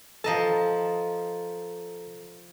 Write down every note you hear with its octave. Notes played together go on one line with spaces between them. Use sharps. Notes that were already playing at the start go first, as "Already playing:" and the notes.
F3 A4 D#5 A5 A#5